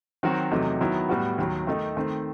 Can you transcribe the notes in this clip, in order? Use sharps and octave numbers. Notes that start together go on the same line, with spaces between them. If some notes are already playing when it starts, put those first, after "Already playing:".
D#3 F#3 C4 F#4
E2 C3 F#3 A3 D#4
D#3 F#3 B3 E4
A2 G3 B3 F#4
D#2 D#3 F#3
D#3 A3 D#4
D#3 A3 C4